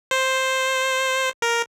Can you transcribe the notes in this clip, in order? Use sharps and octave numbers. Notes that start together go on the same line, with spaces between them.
C5
A#4